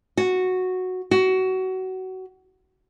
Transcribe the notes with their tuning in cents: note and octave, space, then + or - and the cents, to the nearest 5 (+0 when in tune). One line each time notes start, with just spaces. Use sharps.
F#4 -5
F#4 +20